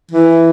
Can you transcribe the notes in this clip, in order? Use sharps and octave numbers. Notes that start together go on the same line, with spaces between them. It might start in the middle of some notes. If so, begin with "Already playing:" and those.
E3